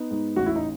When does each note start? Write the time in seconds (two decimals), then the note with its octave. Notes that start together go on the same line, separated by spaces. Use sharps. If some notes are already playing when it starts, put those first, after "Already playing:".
Already playing: B3 D#4
0.11 G#2
0.36 A1 F#4
0.46 E4
0.56 D#4